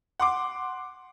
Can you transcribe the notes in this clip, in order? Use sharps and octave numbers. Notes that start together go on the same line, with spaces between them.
F#5 C6 D6